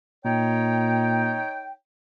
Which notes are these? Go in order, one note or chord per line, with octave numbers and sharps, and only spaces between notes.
A#2 D#4 C#5 G5